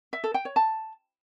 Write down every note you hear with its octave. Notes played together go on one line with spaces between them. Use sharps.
E5
A4
G5
C#5
A5